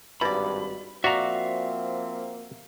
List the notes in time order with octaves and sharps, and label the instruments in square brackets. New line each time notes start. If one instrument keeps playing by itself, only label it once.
[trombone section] G#1 G2 [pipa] B2 D5 [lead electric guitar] B5
[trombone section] F3 A#3 C4 [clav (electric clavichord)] F#4 A#5 [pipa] D5 [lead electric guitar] E5 F5